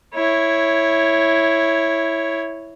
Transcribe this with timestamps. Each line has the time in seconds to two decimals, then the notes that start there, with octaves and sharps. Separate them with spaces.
0.15 E4 C#5